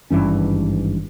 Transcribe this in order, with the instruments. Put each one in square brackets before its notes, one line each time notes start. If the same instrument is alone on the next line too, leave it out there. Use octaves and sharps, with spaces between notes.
[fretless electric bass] G#1 G2 E3 C#4